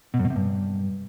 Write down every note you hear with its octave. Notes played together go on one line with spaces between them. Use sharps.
B2
F#2
B2
C3
G2